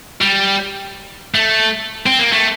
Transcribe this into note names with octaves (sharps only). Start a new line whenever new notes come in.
G3
A3
C4
A#3
A3